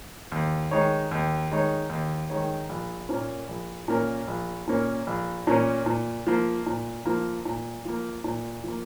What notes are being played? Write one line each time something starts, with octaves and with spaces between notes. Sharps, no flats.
D#2
D#3 G#3 D#4 C#5
D#2
D#3 G#3 D#4 C#5
D#2
D#3 G#3 D#4 C#5
A#1
A#2 A#3 C#4 A#4
A#1
A#2 A#3 C#4 A#4
A#1
A#2 A#3 C#4 A#4
A#1
A#2 A#3 C#4 A#4
A#2
F3 A#3
A#2
F3 A#3
A#2
F3 A#3
A#2
F3 A#3